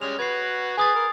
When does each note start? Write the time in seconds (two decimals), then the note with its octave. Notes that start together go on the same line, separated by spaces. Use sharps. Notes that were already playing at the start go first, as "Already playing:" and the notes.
0.02 G3 G#3 C#4 F7
0.19 F#4 B4 G#6 C7
0.77 G#4 B4 G#5 D#6 A6
0.95 A#4